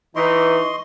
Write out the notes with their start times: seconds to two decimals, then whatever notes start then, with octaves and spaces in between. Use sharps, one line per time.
0.16 E3 D#4 D#5 C6 C#6